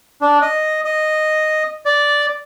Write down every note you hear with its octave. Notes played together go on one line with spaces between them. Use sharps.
D4
D#5
D#5
D5